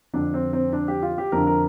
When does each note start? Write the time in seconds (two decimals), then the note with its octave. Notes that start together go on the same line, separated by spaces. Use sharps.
0.14 F2 D3 D4
0.34 C4
0.53 C4
0.73 D4
0.88 G4
1.02 F4
1.18 G4
1.32 F2 D3 A#4
1.47 A#4